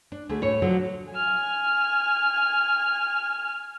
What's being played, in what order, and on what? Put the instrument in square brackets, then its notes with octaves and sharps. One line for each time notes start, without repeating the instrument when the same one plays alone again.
[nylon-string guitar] D4
D2 A3 G#4
A2 C#5
D3 F3 F#3
[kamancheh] G#5 F6